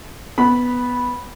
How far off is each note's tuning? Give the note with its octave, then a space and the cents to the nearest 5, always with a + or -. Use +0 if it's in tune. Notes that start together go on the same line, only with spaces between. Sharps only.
B3 +0 B5 -10